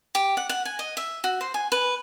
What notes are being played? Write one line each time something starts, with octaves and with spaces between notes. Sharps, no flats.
G4
F#5
F#5
G#5
D#5
E5
F#4
C5
G#5
B4